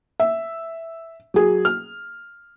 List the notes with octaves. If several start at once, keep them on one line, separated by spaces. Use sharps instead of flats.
E5
F#3 G#4
F6